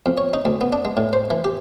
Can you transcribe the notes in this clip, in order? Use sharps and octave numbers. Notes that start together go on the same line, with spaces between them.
F2
C#5
D#4
D2
B3
D4
G#3
A2
C5
E3
G4